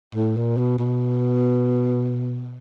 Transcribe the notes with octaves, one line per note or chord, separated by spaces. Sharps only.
A2
A#2
B2
B2